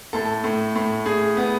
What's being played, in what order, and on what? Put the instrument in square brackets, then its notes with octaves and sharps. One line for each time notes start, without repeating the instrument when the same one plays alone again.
[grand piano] A2 A4
A2
A2
A2 G#4
B3